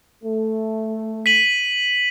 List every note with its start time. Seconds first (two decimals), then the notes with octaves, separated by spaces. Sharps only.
0.24 A3
1.26 B6 D#7 F#7